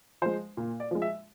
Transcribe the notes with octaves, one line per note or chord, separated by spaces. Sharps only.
F3 G#3 C5
A#2
D5
F3 G#3
E5